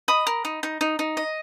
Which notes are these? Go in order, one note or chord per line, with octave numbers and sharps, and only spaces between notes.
D#5 B5 D#6
A#4
D#4
D#4
D#4
D#4
D#5